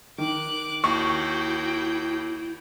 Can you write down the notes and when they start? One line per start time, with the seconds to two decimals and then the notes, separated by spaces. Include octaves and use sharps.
0.18 D#3 D6 F#6
0.84 D#2 E4 F#4 G5 C#6